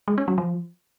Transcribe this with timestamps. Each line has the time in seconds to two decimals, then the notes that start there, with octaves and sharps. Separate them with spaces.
0.08 G#3
0.18 C#4
0.28 F#3
0.38 F3